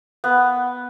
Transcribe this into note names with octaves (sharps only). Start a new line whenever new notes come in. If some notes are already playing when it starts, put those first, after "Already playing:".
B3